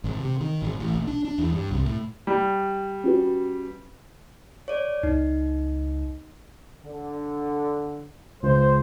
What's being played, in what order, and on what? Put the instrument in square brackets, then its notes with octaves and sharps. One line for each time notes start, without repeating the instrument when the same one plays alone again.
[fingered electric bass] G#1
C3
D#3
G#1
A1
A#1
D4
D4
E2
G2
C2
A2
[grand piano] G3
[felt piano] C#4 F#4 B4
[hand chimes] C#5 D5
[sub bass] C#2 [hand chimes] D#4
[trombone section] D3
[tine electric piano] C#2 [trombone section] C5